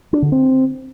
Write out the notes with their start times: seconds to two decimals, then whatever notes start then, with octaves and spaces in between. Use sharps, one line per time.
0.13 D4
0.22 D3
0.32 C4